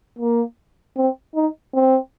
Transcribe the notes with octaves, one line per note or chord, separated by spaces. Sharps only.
A#3
C4
D#4
C4